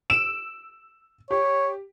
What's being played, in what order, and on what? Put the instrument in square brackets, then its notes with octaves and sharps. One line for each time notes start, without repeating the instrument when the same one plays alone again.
[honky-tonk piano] E6 D7 E7
[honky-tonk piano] G4 [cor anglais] C#5